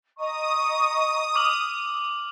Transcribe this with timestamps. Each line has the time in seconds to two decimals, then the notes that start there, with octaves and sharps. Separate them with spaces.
0.18 D#5 A#5 C#6 D#6
1.36 D6 F6 F#7